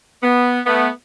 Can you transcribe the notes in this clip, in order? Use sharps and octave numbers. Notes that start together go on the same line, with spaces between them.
B3
A3 B3